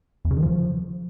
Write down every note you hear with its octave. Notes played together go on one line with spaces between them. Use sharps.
E2
C#3
D#3
F3